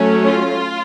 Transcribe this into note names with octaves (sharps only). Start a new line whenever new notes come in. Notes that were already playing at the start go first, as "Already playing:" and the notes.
Already playing: F#3 A3 C#4
F4